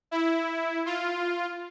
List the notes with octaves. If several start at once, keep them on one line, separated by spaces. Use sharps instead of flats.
E4
F4